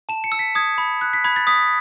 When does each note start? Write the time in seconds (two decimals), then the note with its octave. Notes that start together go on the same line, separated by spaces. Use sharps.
0.09 A5 E7
0.24 C#7
0.32 E6
0.39 B6
0.55 D#6 G#6
0.78 B5
1.01 F#6
1.13 B6
1.24 B5 G#6
1.36 A6
1.47 D#6 B6